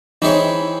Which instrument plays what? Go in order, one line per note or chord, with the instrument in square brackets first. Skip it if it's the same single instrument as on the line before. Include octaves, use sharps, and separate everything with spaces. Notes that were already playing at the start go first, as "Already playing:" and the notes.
[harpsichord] E3 C4 E4 G#4 C#5 [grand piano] D#4